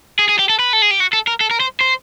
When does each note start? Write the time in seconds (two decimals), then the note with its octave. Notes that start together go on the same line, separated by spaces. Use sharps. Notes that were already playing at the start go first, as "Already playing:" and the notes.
0.19 G#4
0.29 G#4
0.39 G4
0.50 A4
0.59 B4
0.73 A4
0.82 G#4
0.91 G4
1.00 F#4
1.13 A4
1.27 A#4
1.41 A4
1.51 A#4
1.60 C5
1.81 C5